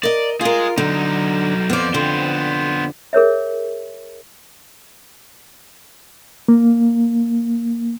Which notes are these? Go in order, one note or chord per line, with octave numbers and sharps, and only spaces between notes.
A#4 D5 D#5
F4 G#4 A#4 D#5
D3 F#3 D#4
F2 F3 B3 D5
F2 D3 B3 C4 C5
G#4 A#4 C#5 E5
A#3